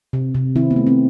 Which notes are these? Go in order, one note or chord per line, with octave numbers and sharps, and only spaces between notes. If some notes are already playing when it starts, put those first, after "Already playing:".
C3
C3
D#3 C4 E4
B3
A3
C4